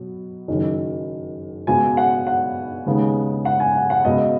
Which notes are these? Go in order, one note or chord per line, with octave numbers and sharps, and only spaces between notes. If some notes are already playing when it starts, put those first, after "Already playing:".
Already playing: B2 F#3 B3
F#1 F#2 D#3
C#2 B2 B3 G#5
F#5
F#5
D#2 C#3 G#3 B3
F#5
G#5
F#5
F#5
C#2 B2 B3 D#5